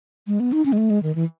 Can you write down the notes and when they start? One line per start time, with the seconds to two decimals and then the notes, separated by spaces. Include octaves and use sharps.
0.27 G#3
0.40 B3
0.52 D#4
0.65 C#4
0.73 G#3
0.77 A3
0.90 G#3
1.03 D#3
1.15 E3